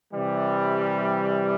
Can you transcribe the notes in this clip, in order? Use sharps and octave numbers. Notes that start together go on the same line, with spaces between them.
C3 E3 G3